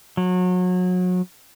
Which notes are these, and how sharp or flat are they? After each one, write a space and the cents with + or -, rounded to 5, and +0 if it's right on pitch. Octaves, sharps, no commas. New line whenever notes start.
F#3 -30